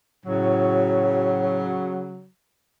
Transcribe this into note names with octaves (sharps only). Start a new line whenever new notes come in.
A2 C#3 F#3